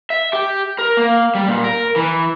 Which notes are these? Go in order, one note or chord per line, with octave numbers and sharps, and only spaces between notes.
E5
G4
A#4
A#3
G3
A#2
A#4
E3